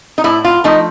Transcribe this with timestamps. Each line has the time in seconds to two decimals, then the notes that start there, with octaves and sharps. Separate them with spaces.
0.18 D#4
0.24 A2 E4
0.45 F4
0.64 F3 A3 D#4